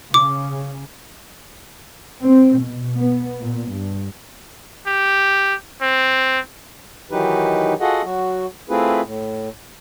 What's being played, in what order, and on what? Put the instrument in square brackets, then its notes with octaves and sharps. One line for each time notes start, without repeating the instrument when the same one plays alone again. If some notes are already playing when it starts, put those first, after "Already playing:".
[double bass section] C#3 [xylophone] D6
[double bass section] C4
B2
B3
A#2
G2
[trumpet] G4
C4
[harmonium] D#3 E3 F#3 D#4 G4 B4
F4 F#4 G#4 A4 D#5 F#5
F#3 F#4
A3 C4 E4 F4 G#4 B4
A2